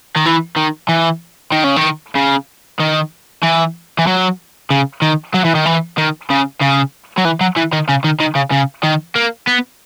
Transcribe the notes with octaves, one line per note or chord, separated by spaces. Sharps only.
D#3
E3
D#3
E3
D#3
C#3
D#3
C#3
D#3
E3
E3
F#3
C#3
D#3
F#3
E3
D#3
E3
D#3
C#3
C#3
F#3
E3
F#3
E3
D#3
C#3
D#3
D#3
C#3
C#3
D#3
A#3
B3